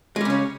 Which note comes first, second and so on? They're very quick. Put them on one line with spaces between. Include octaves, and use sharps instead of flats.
G#3 G3 C#3 C#4